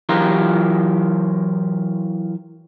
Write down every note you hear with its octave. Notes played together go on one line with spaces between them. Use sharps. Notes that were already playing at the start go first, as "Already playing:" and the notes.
E3 F#3 F4 G4 A#4